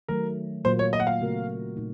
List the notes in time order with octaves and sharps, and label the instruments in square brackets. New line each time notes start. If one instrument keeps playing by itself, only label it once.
[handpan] D#3 F#3 A3 [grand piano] A#4
[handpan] A#2 F#3 A#3 F4 [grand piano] C5
[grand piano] C#5
D#5
F#5
F5
[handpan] C#3 A3 C4 F#4 A#4
A#2 A3 D#4